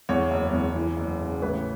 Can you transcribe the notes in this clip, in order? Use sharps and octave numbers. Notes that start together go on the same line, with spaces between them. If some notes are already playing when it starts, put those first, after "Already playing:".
E2 C#5
F#1
E2
E3
F#1
C#3
A1 B4